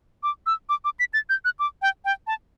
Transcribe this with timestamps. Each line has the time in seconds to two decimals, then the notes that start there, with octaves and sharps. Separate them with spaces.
0.23 D6
0.46 E6
0.69 D6
0.85 D6
0.99 B6
1.14 A6
1.29 G6
1.45 F#6
1.59 D6
1.82 G5
2.05 G5
2.27 A5